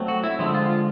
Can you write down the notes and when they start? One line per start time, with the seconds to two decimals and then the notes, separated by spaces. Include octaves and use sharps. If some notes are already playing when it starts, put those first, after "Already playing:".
Already playing: F#3 A3 C4
0.08 F#4
0.24 E4
0.39 D3 F3 G#3 C4 E4
0.54 F4
0.69 F4